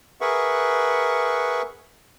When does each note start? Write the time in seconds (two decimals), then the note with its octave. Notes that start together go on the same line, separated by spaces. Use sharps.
0.21 G#4 A#4 B4 E5 F#5 C#6